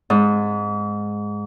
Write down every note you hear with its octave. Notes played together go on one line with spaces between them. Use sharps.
G#2